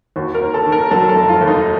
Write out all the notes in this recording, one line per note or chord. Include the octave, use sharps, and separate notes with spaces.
D#2 F#4
A#4
D#2
A4
D#3
A#4
F#3 A4
A4
F1
F4
D#2
D#4